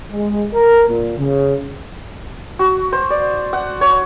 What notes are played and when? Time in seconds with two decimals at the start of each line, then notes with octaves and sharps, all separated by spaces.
0.12 G#3
0.54 A#4
0.89 A#2
1.19 C#3
2.59 F#4
2.92 C5
3.10 D5
3.53 F#5
3.81 C#5